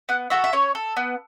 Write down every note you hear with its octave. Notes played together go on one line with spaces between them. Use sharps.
B3 F#5
F#4 A4 E5
E5
C#4 C#5
A4
B3